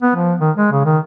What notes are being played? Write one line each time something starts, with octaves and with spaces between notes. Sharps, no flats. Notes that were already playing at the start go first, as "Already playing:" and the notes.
B3
F3
D#3
G#3
C#3
D#3